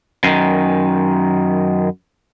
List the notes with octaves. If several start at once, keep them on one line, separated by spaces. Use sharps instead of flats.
F#2 D#3